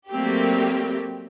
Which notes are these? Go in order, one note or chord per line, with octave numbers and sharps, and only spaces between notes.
F#3 G3 A3 A#3 C4 G4